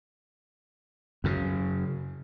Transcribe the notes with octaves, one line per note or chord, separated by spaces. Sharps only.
F#2 C#3